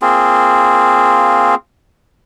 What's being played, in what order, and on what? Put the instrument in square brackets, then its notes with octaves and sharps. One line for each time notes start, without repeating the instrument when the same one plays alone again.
[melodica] A#3 C4 F4 G#4